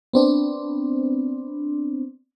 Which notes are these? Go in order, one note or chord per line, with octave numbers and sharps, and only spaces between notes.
B3 C4 D4